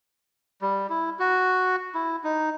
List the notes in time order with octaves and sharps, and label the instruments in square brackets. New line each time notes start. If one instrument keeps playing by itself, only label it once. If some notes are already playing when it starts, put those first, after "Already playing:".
[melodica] G3
E4
F#4
E4
D#4